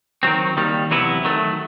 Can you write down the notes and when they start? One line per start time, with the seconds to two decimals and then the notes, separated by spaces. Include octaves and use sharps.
0.23 D#3 F#3 C4
0.57 D#2 D#3 G3
0.91 E2 C3 F#3 B3 E4
1.24 D#3 F#3 A3